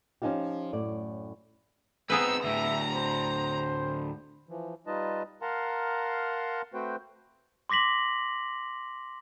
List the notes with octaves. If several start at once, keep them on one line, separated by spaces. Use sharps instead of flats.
F3 C#4 D#4 F4 G4
F#2 A2 D5
B3 C4 D#4 G#4 B4 E6
D2 A2 E5 A#5
C5
E3 F3
G3 D#4 F4 B4 D#5 A5
A#4 F5 F#5 A5 A#5 C6
A3 C4 F#4 B4 C5 G5
C6 D6 A#6 B6 F#7